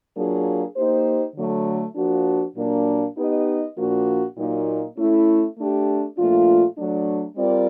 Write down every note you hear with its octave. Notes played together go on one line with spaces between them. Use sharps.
F#3 A#3 D4 F4 G#4
A#3 D#4 G4 C5
D3 F#3 A3
F3 A#3 D4 F#4
A#2 F#3 A#3 D4
B3 D#4 G4 B4 D#5
A#2 F3 A#3 D4 F#4
A#2 F#3 A#3 D#4
A3 C#4 E4
A3 D4 G4
A#2 F3 A3 D4 F4
F#3 A3 D4
G3 C4 F4 A#4 D5